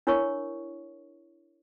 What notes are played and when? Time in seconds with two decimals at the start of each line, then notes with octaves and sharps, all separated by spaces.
0.07 D4 E4 A#4 C#5 C#6